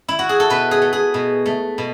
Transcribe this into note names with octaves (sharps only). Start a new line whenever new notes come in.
E4
F#4
G#4
A4
B2 B4
G#4
A3
G#4
B2
A3
B2